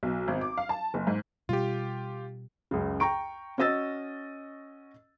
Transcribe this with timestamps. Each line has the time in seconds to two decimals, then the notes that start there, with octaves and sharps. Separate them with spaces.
0.03 B1
0.28 G#1
0.41 D6
0.57 F5
0.69 A5
0.94 F#1
1.07 G#2
1.49 B2 G3 F4 G4
2.71 C#2 F#2 C#3
3.00 G5 A#5 C#6 D7
3.58 C#4 F#4 D#5 E6 A6